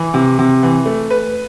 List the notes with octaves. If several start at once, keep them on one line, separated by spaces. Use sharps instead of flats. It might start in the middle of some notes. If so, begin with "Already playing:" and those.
Already playing: E3
C3
C3
E3
A3
B4